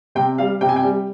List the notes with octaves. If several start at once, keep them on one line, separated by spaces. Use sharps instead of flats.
C3 G5
G3 F5
C3 G5
G#5
G5
G3